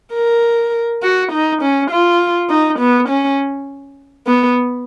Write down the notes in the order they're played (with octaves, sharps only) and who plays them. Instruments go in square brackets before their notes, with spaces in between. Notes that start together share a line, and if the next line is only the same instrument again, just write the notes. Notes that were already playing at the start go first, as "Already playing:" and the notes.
[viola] A#4
F#4
D#4
C#4
F4
D#4
B3
C#4
B3